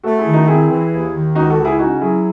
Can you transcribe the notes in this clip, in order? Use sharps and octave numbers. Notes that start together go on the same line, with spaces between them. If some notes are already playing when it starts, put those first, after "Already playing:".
A3 F#4 A4
E4 G#4
D#3
D#4 F#4
C4 E4 G#4
E3
D#2
D#3
C#2 D#4 F#4
F#4 A4
C#3
E4 G#4
C#4 D#4 F#4
F#3 E4 G#4